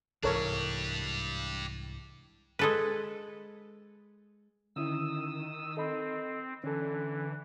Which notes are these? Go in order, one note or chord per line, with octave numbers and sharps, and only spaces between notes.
C2 G#2 E3 D4 G4 A4 A#4 C#5
G#3 A4 B4
D3 D#3 C#4 E4 D#6 E6
C4 A4 D#5 B5
D3 E3 C#4 A4